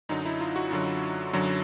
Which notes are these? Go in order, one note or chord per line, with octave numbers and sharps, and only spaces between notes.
F#2 D3 F#3 D#4
E4
F4
F#4
F#2 D3 F#3 F4
F#2 D3 F#3